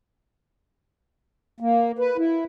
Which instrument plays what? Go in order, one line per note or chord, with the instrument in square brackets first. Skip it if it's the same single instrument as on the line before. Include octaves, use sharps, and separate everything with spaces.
[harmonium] A#3
B4
E4